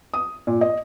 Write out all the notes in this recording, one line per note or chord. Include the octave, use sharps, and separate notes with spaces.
D#6
A#2
D#5